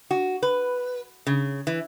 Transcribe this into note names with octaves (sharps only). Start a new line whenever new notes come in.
F#4
B4
C#3
E3